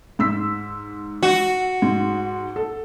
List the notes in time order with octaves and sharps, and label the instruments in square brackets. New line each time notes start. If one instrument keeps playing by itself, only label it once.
[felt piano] G#2 E6 B6
[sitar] F#4
[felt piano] G#2
A4